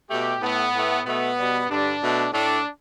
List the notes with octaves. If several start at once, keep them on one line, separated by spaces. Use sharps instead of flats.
B2 A3 G4
A2 A3 B3
A2 A3
B2 A3 B3
B2 G3
G2 D3 G3 D4
B2 A3
A2 A3 D4